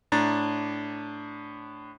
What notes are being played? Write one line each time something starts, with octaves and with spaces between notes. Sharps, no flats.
A2 D4 A#5 A6